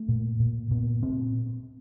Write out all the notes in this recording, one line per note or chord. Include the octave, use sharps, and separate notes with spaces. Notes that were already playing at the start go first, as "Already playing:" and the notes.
Already playing: A3
A#2
A#2
A#2 B3
A#2 C4